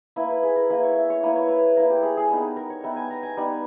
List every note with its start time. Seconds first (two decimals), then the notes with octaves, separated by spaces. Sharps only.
0.16 A#3 E4 B4
0.30 B4
0.43 G#4
0.56 A#4
0.70 A#3 E4 B4
0.83 C#5
0.96 E5
1.10 C#5
1.23 A#3 E4 B4
1.36 C#5
1.49 B4
1.77 A#3 E4 A#4
1.90 G4
2.03 G#4
2.17 G#4
2.31 G3 B3 D#4
2.57 A#4
2.70 C#5
2.83 G3 B3 D#4 E5
2.96 G#5
3.10 A#5
3.23 G#5
3.37 G3 B3 D#4